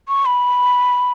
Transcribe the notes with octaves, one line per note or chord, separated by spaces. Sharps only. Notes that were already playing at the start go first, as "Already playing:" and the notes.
C#6
B5